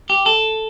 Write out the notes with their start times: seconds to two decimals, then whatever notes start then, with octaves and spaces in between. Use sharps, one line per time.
0.10 G4
0.26 A4